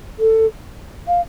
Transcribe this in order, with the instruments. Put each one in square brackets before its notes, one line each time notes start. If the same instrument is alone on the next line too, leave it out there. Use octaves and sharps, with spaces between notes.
[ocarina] A4
F5